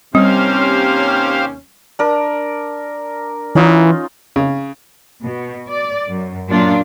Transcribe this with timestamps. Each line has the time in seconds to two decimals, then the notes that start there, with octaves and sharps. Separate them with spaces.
0.15 D#2 C3 G3 C4 C#4 G4 C5 F5
1.99 D4 A#4
3.55 E3 C#4 D#4 F4
4.36 C#3
5.22 B2
5.68 D5
6.08 F#2
6.49 F#2 A#2 D4 F4